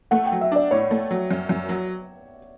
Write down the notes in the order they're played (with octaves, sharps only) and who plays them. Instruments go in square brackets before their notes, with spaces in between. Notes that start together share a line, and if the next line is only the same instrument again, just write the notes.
[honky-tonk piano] A3 [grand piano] F#5
[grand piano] G5
[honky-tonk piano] F#3
[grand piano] E5
[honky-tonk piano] D4 [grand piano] D5
[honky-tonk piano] A2 [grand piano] C#5
[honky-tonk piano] A3
F#3
F#2
F#2
F#3